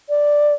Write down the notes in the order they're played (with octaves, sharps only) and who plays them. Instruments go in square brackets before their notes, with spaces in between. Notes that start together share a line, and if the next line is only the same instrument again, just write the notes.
[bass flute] D5